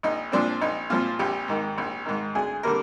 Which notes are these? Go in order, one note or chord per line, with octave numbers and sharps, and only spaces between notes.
A#1 D#4
A#2 F3 C4 D4
A#1 D#4
A#2 F3 C4 F4
A#1 G4
G#2 D#3
A#1
G#2 D#3
D2 G#4
D3 G3 A#3 A#4